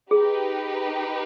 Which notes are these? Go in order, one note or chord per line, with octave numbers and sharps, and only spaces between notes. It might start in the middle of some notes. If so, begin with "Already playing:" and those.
D#4 G4 G#4 B4